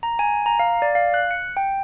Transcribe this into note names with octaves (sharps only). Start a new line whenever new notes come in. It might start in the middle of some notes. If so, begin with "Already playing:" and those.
A#5
G#5
A#5
F5
D5
F5
F#6
C#7
G5